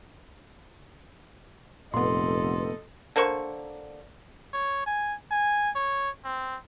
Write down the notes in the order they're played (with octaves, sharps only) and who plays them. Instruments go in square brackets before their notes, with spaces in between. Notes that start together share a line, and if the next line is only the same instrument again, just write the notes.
[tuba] F1 [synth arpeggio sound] A#2 B3 [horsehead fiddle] A4 D#5 [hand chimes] C6
[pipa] D3 A#3 C5 C#6
[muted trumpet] C#5
G#5
G#5
C#5
C4